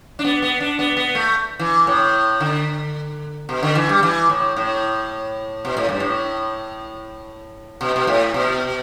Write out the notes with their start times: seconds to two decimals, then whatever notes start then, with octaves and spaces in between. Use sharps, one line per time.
0.19 D4
0.25 B3
0.42 B3
0.60 D4
0.79 B3
0.97 B3
1.15 A3
1.59 E3
1.87 A2
2.40 D3
3.49 B2
3.63 D3
3.75 E3
3.89 G3
4.03 E3
4.30 A2
4.57 A2
5.65 B2
5.77 A2
5.89 G2
6.00 A2
7.81 B2
7.96 B2
8.07 A2
8.34 B2